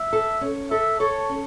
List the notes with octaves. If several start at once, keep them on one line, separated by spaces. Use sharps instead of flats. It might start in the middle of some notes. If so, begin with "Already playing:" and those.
Already playing: E5
A4
C#4
A4 E5
A4 C#5
C#4